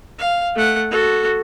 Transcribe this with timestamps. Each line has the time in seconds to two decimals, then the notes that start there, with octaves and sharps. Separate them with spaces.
0.19 F5
0.56 A3 F#5
0.91 F#4 A4